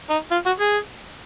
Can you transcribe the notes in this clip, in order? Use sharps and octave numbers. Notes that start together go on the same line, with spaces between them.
D#4
F4
F#4
G#4